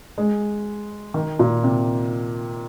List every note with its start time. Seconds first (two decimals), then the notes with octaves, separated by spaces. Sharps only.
0.18 G#3
1.14 D#3
1.39 A#2
1.64 C3